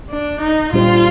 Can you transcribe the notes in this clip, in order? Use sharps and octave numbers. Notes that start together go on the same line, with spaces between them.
D4
D#4
A#2 G3 D4 F4 G4 C5